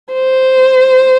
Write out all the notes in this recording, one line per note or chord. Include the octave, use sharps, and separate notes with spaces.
C5